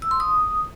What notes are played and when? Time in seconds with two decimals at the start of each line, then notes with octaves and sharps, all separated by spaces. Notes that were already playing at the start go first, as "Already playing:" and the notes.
0.02 E6
0.11 C6
0.20 D#6